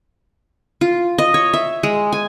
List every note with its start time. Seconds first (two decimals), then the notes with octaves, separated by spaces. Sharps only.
0.81 F4
1.18 D#5
1.34 C#5
1.53 E5
1.83 G#3
2.13 G#5